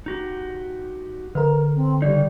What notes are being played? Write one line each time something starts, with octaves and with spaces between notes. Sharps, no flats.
D#4 F#4 G4
D3 A#4 B4 A#5
C4
C#3 G3 D#4 D5